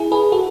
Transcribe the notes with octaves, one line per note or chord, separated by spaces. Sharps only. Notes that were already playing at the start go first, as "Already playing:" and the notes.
Already playing: E4 G#4
G#4 B4
F#4 A4